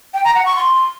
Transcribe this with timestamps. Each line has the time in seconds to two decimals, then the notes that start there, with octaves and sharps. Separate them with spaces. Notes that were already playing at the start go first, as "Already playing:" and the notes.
0.14 G5
0.24 A#5
0.35 F#5
0.46 C#6
0.56 C6